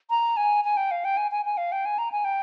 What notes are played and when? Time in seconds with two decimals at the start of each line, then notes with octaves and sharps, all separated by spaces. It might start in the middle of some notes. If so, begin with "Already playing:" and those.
0.10 A#5
0.37 G#5
0.64 G#5
0.77 G5
0.91 F5
1.04 G5
1.17 G#5
1.31 G#5
1.45 G#5
1.57 F5
1.72 G5
1.85 G#5
1.98 A#5
2.12 G#5
2.25 G5